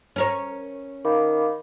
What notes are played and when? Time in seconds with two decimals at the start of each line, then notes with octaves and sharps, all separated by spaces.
0.16 C#4 A#4 C#5
1.05 D#3 F5 B5 D6